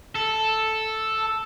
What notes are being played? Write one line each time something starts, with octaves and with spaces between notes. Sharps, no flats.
A4